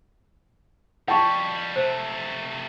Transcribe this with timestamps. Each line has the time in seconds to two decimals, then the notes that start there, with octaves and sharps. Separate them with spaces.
1.08 F2 G3 G5 A5 C#6
1.76 C3 A3 C5